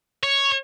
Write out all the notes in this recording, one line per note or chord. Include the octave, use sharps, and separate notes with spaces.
C#5